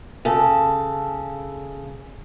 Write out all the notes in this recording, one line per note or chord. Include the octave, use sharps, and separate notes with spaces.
C#3 A4